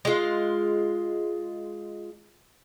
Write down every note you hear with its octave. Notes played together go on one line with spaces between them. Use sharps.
G#3 F4